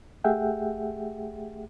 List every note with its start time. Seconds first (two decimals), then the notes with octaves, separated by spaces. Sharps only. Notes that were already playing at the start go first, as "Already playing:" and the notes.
0.24 A3 G4 G#4 E5 F#5 G5